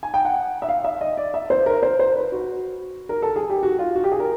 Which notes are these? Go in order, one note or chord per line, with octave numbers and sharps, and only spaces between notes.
G#5
G5
F#5
E5
F5
E5
D#5
D5
E5
C5
A#4
C5
C5
B4
F#4
A#4
A4
G#4
G4
F#4
F4
F#4
G4
G#4
A#4